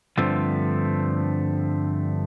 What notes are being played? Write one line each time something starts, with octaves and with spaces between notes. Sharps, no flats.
G2 D3 F3 A3 C4